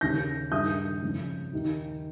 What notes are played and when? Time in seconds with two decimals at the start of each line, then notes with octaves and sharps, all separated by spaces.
0.01 D#2 C#3 G6 A#6
0.52 G2 D#3 D#6 G6
1.02 F2 C#3
1.53 D#2 D#3